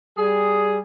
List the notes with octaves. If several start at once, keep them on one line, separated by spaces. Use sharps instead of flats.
G3 G#4